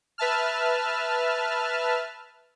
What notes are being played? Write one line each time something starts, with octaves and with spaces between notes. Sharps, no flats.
B4 E5 A5 F6